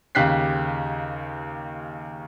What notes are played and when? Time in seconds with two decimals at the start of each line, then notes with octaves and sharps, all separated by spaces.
0.15 D#2 C#3 G4 F#6 B6 C7